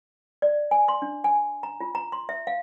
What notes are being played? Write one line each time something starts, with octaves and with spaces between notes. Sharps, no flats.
D5
G#5
C6
D4
G#5
A#5
F4
A#5
C6
E5
F5